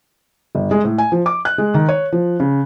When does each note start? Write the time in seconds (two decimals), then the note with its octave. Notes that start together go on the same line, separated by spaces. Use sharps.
0.55 G1
0.71 G#3
0.85 A2
0.98 G#5
1.12 F3
1.26 D6
1.45 F#6
1.58 G#3
1.74 D#3
1.89 C#5
2.12 F3
2.40 C#3